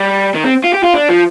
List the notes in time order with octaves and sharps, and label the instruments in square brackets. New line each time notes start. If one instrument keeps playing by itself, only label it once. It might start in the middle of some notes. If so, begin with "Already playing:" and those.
Already playing: [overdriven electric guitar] G3
D#3
C4
F4
G4
F4
D4
F3